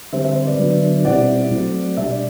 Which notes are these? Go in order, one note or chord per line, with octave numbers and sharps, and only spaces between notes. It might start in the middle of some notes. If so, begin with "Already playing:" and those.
D3 G3 C4 C5 E5
C5 E5
C5 E5
B4 D5
D3 F#3 B3 D4
B2 G3 C4 E4 D5 F#5
F#3 A3 C4
B2 G3 D4 E5
D5